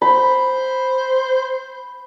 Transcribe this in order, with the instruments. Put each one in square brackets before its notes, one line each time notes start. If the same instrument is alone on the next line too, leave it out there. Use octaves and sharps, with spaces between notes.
[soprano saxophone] C5 [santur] B5